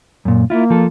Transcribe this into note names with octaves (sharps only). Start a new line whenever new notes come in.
F#2 A#2
A#3 E4 F4
F3 A4